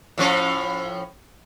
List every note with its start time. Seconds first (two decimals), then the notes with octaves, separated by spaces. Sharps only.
0.18 A2 F3 C#4